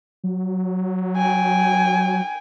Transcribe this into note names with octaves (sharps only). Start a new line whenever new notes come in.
F#3
G5 G#5